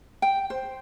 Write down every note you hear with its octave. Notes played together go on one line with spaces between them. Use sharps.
G5
C5